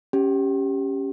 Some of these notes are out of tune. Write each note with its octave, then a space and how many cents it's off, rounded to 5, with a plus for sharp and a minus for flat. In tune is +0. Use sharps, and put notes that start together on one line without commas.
C#4 +0 G4 +0